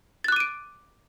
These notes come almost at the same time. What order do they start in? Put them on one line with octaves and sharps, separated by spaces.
A6 F#6 D6 D#7 D7